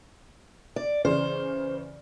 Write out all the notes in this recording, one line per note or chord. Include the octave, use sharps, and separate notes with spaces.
D5
C#3 E3 C5